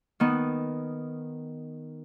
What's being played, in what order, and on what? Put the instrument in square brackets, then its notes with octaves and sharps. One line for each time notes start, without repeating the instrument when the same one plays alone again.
[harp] D#3 B3